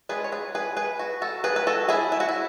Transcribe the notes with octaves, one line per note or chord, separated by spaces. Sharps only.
G#3 B3 D4 G#4 B4
C#5
G#4 B4
G#4 B4
G#4 B4
F#4
F#4 A4
G#4 B4
B4
F#4 A4
E4 G#4
E4
F#4
E4